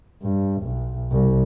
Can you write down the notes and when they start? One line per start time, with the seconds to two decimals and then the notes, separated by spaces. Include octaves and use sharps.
0.22 G2
0.63 B1
1.12 C2